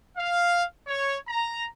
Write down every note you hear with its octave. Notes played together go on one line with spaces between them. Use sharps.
F5
C#5
A#5